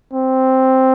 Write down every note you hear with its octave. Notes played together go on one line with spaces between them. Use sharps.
C4